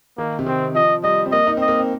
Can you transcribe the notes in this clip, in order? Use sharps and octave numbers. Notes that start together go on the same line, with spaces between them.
D#3 A#3
C3
D#3 C4
F3 D#5
G3 D#5
C4
A#3 D#5
D#4
C4 D#5
A#3
C4